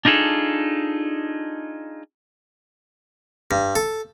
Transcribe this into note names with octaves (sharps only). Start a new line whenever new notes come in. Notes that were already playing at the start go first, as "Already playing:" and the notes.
D4 D#4 F4 G#4 A4
G2
A4